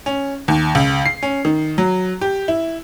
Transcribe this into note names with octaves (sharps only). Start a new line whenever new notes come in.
C#4
D#2
C#2
C7
C#4
D#3
F#3
G4
E4